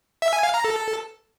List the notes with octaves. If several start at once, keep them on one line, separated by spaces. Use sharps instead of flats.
E5
G#5
F5
A#5
A4